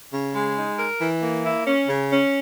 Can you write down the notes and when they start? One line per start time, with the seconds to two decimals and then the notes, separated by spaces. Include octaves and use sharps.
0.13 C#3
0.35 G#3
0.57 D#4
0.79 A#4
1.01 E3
1.23 A#3
1.44 E4
1.67 C#4
1.88 C#3
2.11 C#4